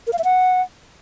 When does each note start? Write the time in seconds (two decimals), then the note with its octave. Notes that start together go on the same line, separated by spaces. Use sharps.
0.07 A#4
0.13 F5
0.19 E5
0.24 F#5